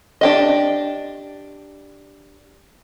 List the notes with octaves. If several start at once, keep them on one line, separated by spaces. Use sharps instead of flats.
D4 G4 D#5